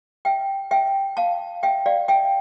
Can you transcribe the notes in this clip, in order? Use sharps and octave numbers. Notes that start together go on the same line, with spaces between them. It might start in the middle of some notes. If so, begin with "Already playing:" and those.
E5 G5
E5 G5
F5 A5
E5 G5
D5 F5
E5 G5